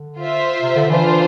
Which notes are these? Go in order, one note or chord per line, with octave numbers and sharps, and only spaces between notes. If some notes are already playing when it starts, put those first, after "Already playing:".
Already playing: D3
F4 C5 E5
C3
D3
E3 D4 F4 C5